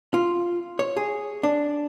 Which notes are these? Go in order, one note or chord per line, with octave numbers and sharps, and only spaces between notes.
F4
C#5
G#4
D4